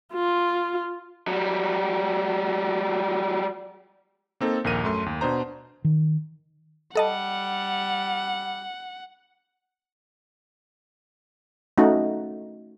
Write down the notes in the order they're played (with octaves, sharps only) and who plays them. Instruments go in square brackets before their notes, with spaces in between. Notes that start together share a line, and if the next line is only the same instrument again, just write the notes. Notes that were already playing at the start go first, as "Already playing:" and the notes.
[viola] F4
[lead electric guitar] F#3 G3
[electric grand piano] A#3 C4 D#4 A4
A#1 D#2 A#4 D#7
F#2 A3 C6
D#2
B2 D4 C5 A#5
[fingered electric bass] D#3
[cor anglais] G3 [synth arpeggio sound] A4 D#5 A5 [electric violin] F#5
[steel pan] A3 C#4 D#4 F#4